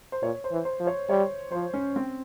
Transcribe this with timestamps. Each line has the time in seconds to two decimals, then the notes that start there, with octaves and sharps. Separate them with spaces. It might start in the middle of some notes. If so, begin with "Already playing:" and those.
0.12 C5
0.22 A#2 C#5
0.44 C5
0.52 E3
0.65 C5
0.80 F3
0.87 C#5
1.09 G3 C#5
1.52 F3 C5
1.74 C#4
1.96 C4